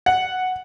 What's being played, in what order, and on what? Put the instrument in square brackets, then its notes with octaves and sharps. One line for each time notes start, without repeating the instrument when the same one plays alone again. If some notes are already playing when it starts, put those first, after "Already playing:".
[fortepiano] F#5